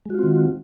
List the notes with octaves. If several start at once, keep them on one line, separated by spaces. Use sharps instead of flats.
D#3 G#3 C4 F4 F#4